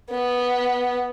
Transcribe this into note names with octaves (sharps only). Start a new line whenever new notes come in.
B3